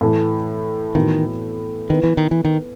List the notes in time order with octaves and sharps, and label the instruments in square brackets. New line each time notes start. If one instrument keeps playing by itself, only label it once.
[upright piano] A2 E3 A3
[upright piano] A2 E3 B3 F#4 A4 [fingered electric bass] D#3
[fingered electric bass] D#3 [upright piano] B3 E4 B4
[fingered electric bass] E3
D#3
E3
D#3